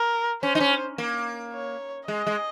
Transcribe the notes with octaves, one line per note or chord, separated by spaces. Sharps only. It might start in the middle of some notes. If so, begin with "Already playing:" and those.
Already playing: A#4
C#4 C5
D#4
C#4
A#3
C#5
G#3 D#5
G#3